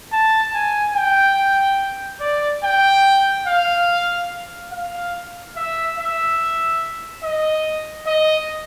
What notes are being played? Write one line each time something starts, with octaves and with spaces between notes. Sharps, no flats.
A5
G#5
G5
D5
G5
F5
F5
E5
E5
D#5
D#5